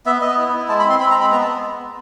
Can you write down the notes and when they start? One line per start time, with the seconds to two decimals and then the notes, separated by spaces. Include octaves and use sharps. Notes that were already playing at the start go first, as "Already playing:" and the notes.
0.06 B3 E5
0.21 B3 D#5
0.38 E4
0.53 E4
0.68 G#3 A5
0.79 B5
0.85 C4
0.90 C6
1.00 C4 B5
1.11 A#5
1.16 G#3
1.21 B5
1.31 B3 A#5
1.42 A5
1.46 B3